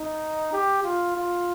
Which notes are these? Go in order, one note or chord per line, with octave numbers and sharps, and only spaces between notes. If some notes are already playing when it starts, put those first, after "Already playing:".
Already playing: D#4
G4
F4
F4